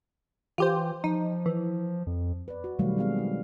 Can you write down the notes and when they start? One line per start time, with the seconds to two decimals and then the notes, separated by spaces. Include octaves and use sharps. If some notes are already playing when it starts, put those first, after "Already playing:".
0.58 E3 F4 G4 C5
1.04 F3 D#4
1.46 E3
2.07 F2
2.48 B4 D5
2.64 F#4
2.79 B2 D#3 F#3 G3 A3 F5
2.97 F#3 G#3 C4 G#4 F5
3.19 D#4